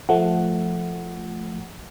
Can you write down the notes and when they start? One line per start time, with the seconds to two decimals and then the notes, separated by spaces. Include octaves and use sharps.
0.09 F3 A3 F#5